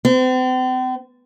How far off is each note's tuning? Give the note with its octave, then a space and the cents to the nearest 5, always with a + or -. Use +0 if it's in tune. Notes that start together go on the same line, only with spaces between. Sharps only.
C4 -40